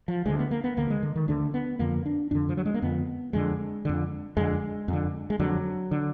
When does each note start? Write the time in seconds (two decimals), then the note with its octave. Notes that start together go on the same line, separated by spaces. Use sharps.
0.08 F3
0.26 D2 D3 G#3
0.39 B3
0.51 A#3
0.64 B3
0.77 D2 D3 A#3
0.90 G#3
1.03 D3
1.15 D#3
1.28 D2 D3 D4
1.54 B3
1.79 F2 D3 A#3
2.06 D4
2.31 F2 D3 D4
2.49 F3
2.57 F#3
2.66 G#3
2.74 A#3
2.82 F2 D3 B3
3.33 F2 D3 G#3
3.85 F2 D3
4.37 F2 D3 G#3
4.88 F2 D3
5.30 G#3
5.39 F2 D3 F#3
5.91 D3